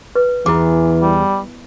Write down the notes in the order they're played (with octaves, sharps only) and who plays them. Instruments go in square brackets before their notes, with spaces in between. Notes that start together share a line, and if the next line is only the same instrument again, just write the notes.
[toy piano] B4
[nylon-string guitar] E2 [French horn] E3 [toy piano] E4 D6
[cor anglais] G3